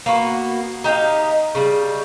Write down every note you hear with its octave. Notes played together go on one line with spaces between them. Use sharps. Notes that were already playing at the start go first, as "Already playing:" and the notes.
A#3 B3 F#4
D#4 G4 D#5 F5
C#3 G3